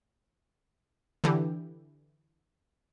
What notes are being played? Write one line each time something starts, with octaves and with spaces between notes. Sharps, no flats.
D3 E3 G4